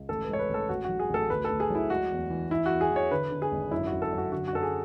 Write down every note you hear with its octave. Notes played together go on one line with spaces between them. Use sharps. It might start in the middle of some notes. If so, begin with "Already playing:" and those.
Already playing: C#2
A1 A4
B4
G#3 C#5
B4
A1
A4
A1 F#4
F#3 F#4
G#4
A1 A4
D2 B4
D2 A4
G#4
F#3 E4
G#3 F#4
E2
E3
E3 E4
F#4
E2
G#4
E3 C#5
D3 B4
D3
G#4
G#1
F#2 E4
F#4
F#2
A4
F#2
F#4
D3 F#4
F#4
F#2 A4
G#4